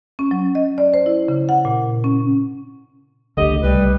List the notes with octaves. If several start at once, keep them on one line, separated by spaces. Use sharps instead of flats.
C#4
F#3
D#5
D5
C5
E4
C#3
F#5
A#2
C#4
C#2 D3 A3 G4 D#5
C2 G3 B4